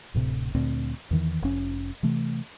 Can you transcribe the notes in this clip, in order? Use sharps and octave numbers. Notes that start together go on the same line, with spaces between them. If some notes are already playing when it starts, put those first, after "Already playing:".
D1 A2 C3
D2 A#2 C4
E2 D#3 E3
F1 C#4
C3 E3 A3